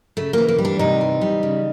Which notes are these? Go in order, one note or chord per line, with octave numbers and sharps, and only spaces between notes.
C#3 A3
E3 A#3
A#3
G3
D4
C3 D#4
E3
G3
C#3